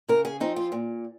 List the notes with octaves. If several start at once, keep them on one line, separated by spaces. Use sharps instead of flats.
C#3 A#4
G#4
F3 C4 D#4
F4
A#2